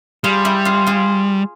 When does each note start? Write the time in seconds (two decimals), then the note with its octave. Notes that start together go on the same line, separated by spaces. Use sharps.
0.24 G3 F4 G#4
0.45 E4 G4
0.65 F4 G#4
0.87 F4 G#4